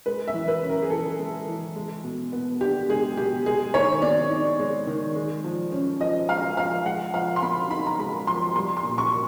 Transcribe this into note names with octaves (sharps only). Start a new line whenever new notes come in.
G#3 B4
E5
E3
B4
C#4
A#4
G#4
E3 A4
G#3
E3
G#3
B2
B3
D4 G4
G#3 G#4
B2 G4
G#3 G#4
D#3 C#5
C4 D5
D#4
G#3
D#3
G#3
F3
C#4
F3 D#5
G#3 F5
F3 F5
G#3 F#5
F3 F5
C6
C4 B5
D#4 B5
A#5
G#3 B5
F3 C6
G3 C6
C6
A#2
C#6
A#3